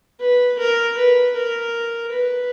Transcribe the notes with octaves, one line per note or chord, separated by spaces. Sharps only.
B4
A#4
B4
A#4
B4